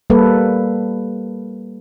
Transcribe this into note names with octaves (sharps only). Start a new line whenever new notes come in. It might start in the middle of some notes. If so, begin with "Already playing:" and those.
G3 A#3 A4 B4